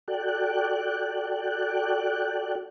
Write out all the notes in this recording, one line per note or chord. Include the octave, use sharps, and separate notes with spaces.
F#4 A4 D5 G5 F#6